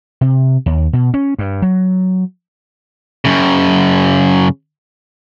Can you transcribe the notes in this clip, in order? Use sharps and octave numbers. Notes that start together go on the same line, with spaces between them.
C3
D#2
B2
C#4
G2
F#3
F#2 C#3